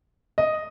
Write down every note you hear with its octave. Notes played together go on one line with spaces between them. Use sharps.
D#5